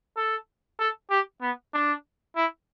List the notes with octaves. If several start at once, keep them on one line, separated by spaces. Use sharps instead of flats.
A4
A4
G4
B3
D4
E4